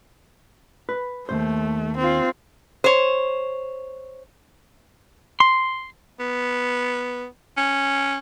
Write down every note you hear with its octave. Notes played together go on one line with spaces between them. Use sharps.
B4
D#2 G#2 A3 C5
C4 F4
C5 C#5
C6
B3
C#4